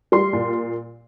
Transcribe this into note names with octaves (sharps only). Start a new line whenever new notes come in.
G3 C6
A#2